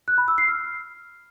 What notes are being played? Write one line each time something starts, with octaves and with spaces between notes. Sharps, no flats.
F#6
B5
E6
C7
F6